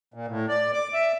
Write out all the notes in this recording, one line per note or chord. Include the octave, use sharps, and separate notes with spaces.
A#2
A2
D5
D6
E5